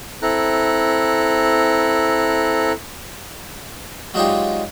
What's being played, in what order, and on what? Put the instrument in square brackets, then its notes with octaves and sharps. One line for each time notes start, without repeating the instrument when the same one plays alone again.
[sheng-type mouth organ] C4 E4 A4 A#5 F#6
[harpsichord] F#3 G#3 D4 D#4 F4 G4